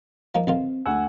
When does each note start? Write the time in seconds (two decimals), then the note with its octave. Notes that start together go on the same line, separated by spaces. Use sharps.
0.35 F3 A#3 D#4
0.47 B1 D#3 C4 F4
0.86 D2 F#5 G#5 E6